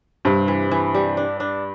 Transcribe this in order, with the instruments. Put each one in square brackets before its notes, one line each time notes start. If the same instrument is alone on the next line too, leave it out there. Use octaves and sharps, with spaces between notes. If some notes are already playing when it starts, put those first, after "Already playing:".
[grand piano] G2 [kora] C3
[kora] E3
E3
G3
D4
D4